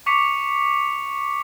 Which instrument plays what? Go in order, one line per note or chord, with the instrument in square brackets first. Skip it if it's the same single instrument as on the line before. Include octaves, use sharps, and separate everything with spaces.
[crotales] C#6 D6 B6 C#7 F7